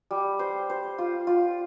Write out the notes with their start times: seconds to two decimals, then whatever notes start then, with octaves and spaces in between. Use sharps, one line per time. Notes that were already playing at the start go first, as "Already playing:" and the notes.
0.11 G3
0.39 C5
0.70 C5
0.98 F4
1.27 F4